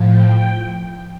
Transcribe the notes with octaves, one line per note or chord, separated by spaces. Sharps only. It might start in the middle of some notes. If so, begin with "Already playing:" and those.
Already playing: A2 F3
G5